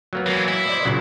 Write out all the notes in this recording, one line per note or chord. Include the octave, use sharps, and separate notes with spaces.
F#3 A#3 B3
E3 G#3
E4
C5 D5 D#5
A#2 C#3 F#3